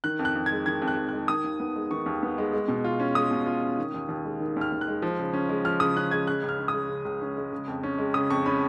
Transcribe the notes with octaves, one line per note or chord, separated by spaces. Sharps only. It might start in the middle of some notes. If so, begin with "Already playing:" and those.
D#3 F#6
F2
F#6
F2
G#6
G#3
D#3 G#6
F2
F#6
F2
G#3 F#6
D#3 D#6
D#2
B3
G#3
D#3 C#6
D#2
B3
G#3
G#3
B2
F4
C#4
G#3 D#6
B2
F4
C#4
D#3
D#2
D#2
G#3
D#3
D#2 F6
D#2
F#6
G#3
F3
C#3
C#4
G#3
F3 F6
C#3 D#6
C#4 F#6
G#3 G#6
C#3 F#6
C#2
F6
C#4
D#6
G#3
C#3
C#2
C#4
G#3
C#3
F2
C#4
G#3
C#3 D#6
F2 C#6
C#4 B5